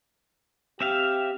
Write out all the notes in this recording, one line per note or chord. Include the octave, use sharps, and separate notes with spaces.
C4 G4 E5 F5